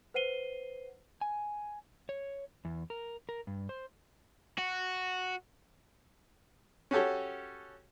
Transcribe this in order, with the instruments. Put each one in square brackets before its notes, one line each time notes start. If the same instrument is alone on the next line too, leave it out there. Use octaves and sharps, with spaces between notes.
[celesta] B4 C5 F#5 C7 D#7 G7
[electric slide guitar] G#5
C#5
E2
A#4
A#4
G2
C5
[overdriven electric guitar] F#4
[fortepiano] C#4 F#4 G4 A4 C#5